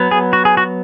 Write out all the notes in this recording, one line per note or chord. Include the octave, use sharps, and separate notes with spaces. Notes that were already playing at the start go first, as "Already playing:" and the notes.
Already playing: F#3 B3
G#4
F#4
G#4
F#4